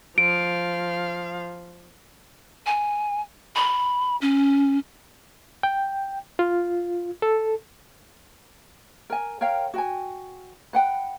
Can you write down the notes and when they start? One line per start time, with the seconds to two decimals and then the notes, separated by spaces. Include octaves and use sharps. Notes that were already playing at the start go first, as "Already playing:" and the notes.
0.18 F3 F5 D7
2.66 G#5
3.55 B5
4.21 C#4
5.63 G5
6.39 F4
7.22 A4
9.10 A#4 G#5
9.41 A#4 C#5 F5 G5
9.74 F#4 G5 G#5
10.73 B4 F#5 G5